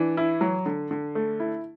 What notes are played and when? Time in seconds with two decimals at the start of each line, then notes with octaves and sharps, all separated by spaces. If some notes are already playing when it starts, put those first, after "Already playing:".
Already playing: E3 D4
0.17 E4
0.41 F#3
0.66 D3
0.91 D3
1.15 A3
1.40 E4